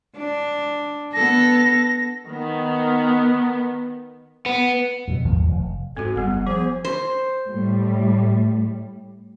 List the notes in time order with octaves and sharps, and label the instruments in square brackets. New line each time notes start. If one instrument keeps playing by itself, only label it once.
[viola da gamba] D4
[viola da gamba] B3 A4 [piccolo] A#6
[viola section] D#3 B3
[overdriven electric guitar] B3
[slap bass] F2 B2
G#1 D#2 D#3 F3
F1
[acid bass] G#2 [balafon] C4 F#4 [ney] A4
[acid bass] F#1 [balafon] G3 B3 [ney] F#5
[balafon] F3 B3 [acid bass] G#4 [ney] C5
[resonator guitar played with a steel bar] C5
[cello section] A2 G3